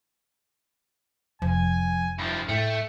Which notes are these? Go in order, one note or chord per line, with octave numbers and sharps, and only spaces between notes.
F1 F3 G#5
G2 F3 E4
A2 A3 G5